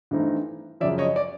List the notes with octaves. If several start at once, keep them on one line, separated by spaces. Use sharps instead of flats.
G2 E3 A3 C4 D#4
F#2 C#3 F3 D5 E5
C#5 D#5
D5